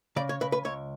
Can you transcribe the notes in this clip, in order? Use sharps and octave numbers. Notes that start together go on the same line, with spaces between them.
C#3 D5
C#5
C#3 B4
B4
C#2 C#5